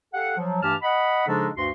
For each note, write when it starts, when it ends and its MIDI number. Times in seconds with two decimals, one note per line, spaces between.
0.14 0.33 67
0.14 0.33 69
0.14 0.33 77
0.14 0.33 78
0.37 0.58 53
0.37 0.58 54
0.62 0.74 43
0.62 0.74 52
0.62 0.74 57
0.62 0.74 67
0.62 0.74 81
0.62 0.74 89
0.82 1.24 75
0.82 1.24 78
0.82 1.24 83
1.27 1.48 49
1.27 1.48 53
1.27 1.48 56
1.27 1.48 62
1.27 1.48 63
1.27 1.48 69
1.56 1.69 38
1.56 1.69 43
1.56 1.69 66
1.56 1.69 84